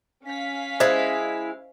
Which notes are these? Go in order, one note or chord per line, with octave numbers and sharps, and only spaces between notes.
C#4 F5 B6
G#3 E4 C5 D#5